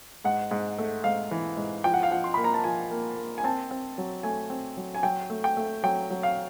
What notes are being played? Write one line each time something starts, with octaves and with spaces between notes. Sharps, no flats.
G#2 F#5
G#2
A3
G#2 F5
E3
G#2
F3 G5
F#5
F5
F3 F#5
C6
A#3 B5
A#5
A5
F3 G#5
A#3
A#3
G#5
C4 A5
C4
F#3
A3 G#5
C4
F#3
G#5
F#3 G5
A3
G5
A3
F#3 G5
F#3
F5